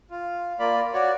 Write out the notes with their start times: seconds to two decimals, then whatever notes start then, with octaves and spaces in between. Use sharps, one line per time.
0.10 F4
0.59 A#3 F4 D5 B5
0.94 F#4 C#5 D5